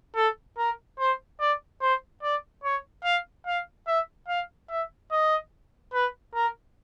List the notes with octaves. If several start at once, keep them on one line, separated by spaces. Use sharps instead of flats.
A4
A#4
C5
D5
C5
D5
C#5
F5
F5
E5
F5
E5
D#5
B4
A#4